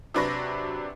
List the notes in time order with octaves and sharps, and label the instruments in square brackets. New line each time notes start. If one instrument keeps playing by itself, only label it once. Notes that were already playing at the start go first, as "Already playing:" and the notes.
[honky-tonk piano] C3 F#3 D4 B4 C#6 A#6